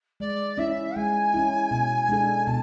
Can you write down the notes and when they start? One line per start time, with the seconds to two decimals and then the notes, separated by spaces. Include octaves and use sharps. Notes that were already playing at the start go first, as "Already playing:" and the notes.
0.20 G#3 D5
0.58 C#4 E4 E5
0.96 G#3 G#5
1.34 C#4 E4
1.71 B2
2.09 G#3 D4 A4
2.47 B2 A5